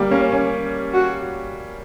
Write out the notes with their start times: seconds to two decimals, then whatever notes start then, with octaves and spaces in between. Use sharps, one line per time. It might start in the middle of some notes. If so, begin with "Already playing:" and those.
Already playing: G3 A#3
0.11 A#3 C#4
0.32 C#4
0.94 F#4